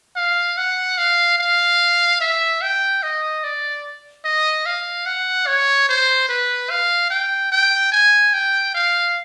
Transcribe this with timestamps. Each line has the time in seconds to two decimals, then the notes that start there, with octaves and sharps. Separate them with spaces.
0.16 F5
0.57 F#5
0.98 F5
1.39 F5
2.21 E5
2.62 G5
3.03 D#5
3.44 D5
4.24 D#5
4.66 F5
5.06 F#5
5.47 C#5
5.89 C5
6.28 B4
6.70 F5
7.10 G5
7.52 G5
7.92 G#5
8.33 G5
8.74 F5